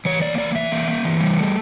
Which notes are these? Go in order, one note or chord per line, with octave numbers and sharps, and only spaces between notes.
E3 C#5
A#3 D5
E3 D5
E3 E5
A#3
A#3
E3
G3
A3